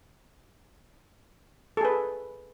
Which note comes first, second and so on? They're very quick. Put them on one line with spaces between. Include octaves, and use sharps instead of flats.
A4 G#4 B4